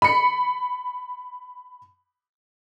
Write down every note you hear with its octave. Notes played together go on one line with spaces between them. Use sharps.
B5 C#7